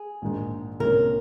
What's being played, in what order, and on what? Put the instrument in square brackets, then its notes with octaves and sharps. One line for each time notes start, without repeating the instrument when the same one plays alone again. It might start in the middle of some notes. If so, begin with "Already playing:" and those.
Already playing: [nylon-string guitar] G#4
[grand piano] A#1 G#2 D#3 G#3 D#4
[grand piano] C2 A#2 G#3 C#4 [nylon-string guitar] A#4